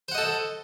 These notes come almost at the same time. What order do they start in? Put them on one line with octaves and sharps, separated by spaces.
C5 F#5 D#5 A4